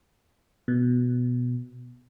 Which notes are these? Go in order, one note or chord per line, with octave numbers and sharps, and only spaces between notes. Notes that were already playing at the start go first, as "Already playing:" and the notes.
B2